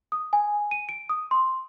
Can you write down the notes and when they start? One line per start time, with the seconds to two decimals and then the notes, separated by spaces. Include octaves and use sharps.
0.12 D#6
0.33 G#5
0.71 D#7
0.89 D7
1.09 D#6
1.31 C6